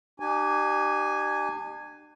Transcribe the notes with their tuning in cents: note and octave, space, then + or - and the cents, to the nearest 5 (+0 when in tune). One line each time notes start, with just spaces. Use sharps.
D4 +45 G4 -25 G#5 +0